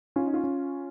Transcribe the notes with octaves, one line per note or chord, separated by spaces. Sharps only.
C#4 F4
D#4
F4
C#4